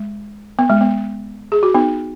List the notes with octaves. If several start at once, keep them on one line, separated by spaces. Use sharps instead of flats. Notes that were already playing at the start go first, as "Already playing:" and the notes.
Already playing: G#3
B3
G#3
B3
G#4
F#4
B3 D#4